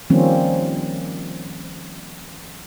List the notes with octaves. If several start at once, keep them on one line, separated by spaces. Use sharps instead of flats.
D#3 F3 G3 A#3 C4 C#4